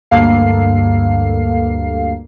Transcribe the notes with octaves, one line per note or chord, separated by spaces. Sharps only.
D2 G2 A#3 A4 F5 C7